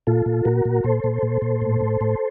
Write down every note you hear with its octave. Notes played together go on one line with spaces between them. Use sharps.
A#2 F4 A4
A#2
A#2 F#4 A#4
A#2
A#2 A4 C5
A#2
A#2
A#2
A2
A2
A2